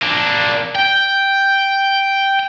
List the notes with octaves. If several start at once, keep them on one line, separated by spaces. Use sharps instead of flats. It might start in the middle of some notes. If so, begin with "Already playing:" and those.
A#3 D4
G5